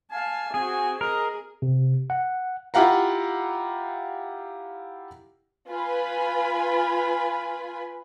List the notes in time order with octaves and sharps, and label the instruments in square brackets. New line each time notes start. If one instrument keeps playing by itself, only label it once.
[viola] F5 A5 [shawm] G#5
[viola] C4 F#4 [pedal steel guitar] G#4 [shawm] G#5
[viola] G#4 [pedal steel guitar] A#4 [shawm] D#5
[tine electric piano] C3
F#5
[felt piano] E4 F4 G4 F5 F#5 A#5
[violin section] F4 B4 G#5 B5